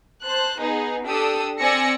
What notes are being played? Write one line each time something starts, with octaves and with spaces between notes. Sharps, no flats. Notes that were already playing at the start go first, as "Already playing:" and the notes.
C5 A5 F#6
B3 D#4 G#4
D4 G4 A4 D#6 E6
C4 D5 G#5 E6 A#6 C#7